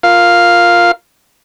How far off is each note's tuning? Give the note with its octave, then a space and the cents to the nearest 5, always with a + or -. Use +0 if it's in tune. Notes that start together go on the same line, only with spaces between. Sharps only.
F4 +0 A#4 +0 F5 +0